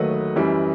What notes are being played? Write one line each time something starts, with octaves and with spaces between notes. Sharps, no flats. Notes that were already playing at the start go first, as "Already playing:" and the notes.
Already playing: D#2 D#3 F#3 A3 B4 D#5
F#2 E3 G3